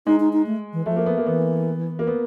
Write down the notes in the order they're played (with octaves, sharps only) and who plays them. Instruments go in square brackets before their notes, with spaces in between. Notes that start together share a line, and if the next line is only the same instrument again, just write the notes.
[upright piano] G#3 [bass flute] D#4
[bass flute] D#4
D#4
A3
E3
[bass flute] F3 [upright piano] A3
[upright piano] A#3
B3
A#3
[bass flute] E3 [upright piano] B3
[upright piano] A#3
B3